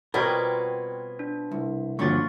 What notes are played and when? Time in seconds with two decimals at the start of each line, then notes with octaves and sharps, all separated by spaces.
0.14 B2 G3 B3 C4 F4 A#4 C#5 G#6
1.19 D4
1.51 C2
1.99 G2 A#2 D3 F3 F#3 F4 C#6 A6